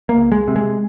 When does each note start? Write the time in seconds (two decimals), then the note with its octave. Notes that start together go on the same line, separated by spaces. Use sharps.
0.09 A#3
0.17 C#2
0.32 G#3
0.48 C3
0.56 G#3